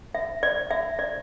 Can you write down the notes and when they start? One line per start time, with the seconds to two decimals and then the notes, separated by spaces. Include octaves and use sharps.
0.15 E5
0.43 D5
0.71 E5
0.99 D5